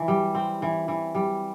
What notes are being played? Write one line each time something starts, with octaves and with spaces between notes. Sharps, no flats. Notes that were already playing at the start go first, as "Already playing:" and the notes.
Already playing: E3
G3
C4
E3
E3
G3